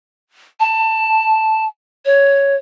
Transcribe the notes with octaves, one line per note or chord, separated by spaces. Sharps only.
A5
C#5